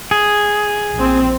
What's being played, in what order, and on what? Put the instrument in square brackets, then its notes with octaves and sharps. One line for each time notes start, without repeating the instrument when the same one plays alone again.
[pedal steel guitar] G#4
[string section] A#1 C4